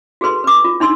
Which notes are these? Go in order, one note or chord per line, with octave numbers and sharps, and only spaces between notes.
F#4 G#4 A4 B4 C6
B4 D6
F4
D4 D#4 C6 E6